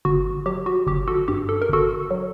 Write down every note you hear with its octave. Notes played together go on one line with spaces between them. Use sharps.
G1 F#4
F#3 G4
F#4
G1 G4
F#4 A4
G2 G4
A4
A#4
G1 F#4 A4
F#3